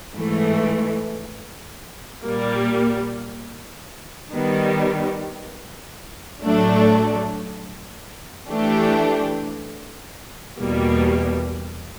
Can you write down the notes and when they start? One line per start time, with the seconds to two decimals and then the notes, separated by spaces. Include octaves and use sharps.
0.14 G#2 E3 A3
2.23 A#2 G3 A#3
4.31 D#3 G3 B3
6.41 A2 F#3 A3 D4
8.48 E3 A3 D4 G4
10.57 E2 B2 G3 A#3